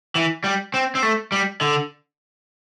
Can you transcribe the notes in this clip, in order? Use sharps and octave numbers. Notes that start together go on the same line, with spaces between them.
E3
G3
C4
C4
A3
G3
D3